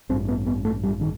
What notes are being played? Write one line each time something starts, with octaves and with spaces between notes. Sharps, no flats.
A1 G2 C4
B3
B3
A3
G3
D#3